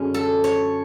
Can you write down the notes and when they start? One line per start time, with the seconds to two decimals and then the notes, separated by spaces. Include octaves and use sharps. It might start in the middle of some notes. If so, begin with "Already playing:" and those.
Already playing: F#2 D3 G#3 C#4
0.14 A4
0.44 C#5